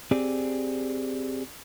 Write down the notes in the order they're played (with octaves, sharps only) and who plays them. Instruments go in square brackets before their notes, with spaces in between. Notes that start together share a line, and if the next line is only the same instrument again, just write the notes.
[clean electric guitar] C4 G4 G#4 D5